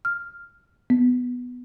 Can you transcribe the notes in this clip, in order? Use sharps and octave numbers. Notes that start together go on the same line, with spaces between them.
F6
B3